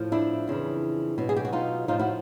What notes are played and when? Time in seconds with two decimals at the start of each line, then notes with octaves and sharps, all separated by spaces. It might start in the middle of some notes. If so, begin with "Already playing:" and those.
Already playing: A2 F3
0.12 D4 E4
0.48 F2 C#3 E3
1.18 B2 F#3
1.29 G#4
1.36 G4
1.45 F#4
1.53 D#4 F4
1.88 A2 F3 D#4 F4
2.00 E4 F#4